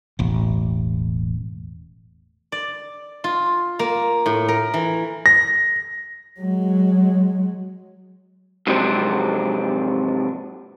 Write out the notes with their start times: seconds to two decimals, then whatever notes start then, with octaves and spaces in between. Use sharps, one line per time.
0.19 E1 A1
2.52 D5
3.24 F4
3.79 A#3
4.26 A2
4.49 A#4
4.74 E3
5.26 A#6
6.40 F#3 G#3
8.67 G#2 C3 F3 F#3 C4 D4